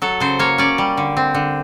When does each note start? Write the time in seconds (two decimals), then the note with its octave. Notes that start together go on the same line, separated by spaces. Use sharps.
0.02 F#3 A4
0.20 C#3 C5
0.39 A#3 C#5
0.58 C#4 D5
0.78 G3
0.97 D3
1.17 C4
1.34 D3